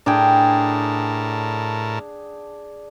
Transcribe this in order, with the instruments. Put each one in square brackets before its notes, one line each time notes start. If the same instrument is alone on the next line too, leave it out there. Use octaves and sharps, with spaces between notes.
[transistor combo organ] A2 A#4 A5 [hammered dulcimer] D4 G#4 G5